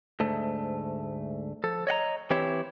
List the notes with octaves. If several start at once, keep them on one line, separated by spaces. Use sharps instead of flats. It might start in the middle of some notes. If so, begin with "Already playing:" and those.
D2 G#2 A3
F3 A4
C#5 D#5 F#5 A#5
E3 C4 E4 G4 C#5